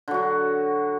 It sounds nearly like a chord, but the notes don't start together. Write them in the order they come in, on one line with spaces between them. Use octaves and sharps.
D3 F#3 F#4